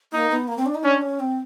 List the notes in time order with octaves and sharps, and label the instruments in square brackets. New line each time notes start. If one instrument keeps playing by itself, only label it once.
[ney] A#3 [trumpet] D#4
[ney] B3
A#3
C4
D4
D#4
[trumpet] C#4 [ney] D4
[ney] C#4
C4